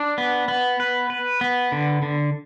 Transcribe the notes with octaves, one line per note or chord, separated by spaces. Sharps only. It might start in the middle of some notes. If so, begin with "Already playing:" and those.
Already playing: D4
B3
B3
B4
B4
B3
D3
D3